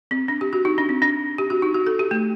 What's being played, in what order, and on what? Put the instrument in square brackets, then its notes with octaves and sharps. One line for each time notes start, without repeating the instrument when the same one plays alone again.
[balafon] C4
D4
G4
F#4
D#4
D4
C4
D4
G4
F#4
D#4
F#4
A4
G4
A3